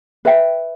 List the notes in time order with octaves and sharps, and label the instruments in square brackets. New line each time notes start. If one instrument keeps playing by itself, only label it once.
[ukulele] B4 E5 G5